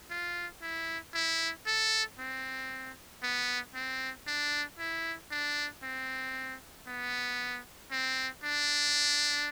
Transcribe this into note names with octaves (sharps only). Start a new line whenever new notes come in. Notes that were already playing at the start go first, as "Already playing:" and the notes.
F4
E4
E4
A4
C4
B3
C4
D4
E4
D4
C4
B3
C4
D4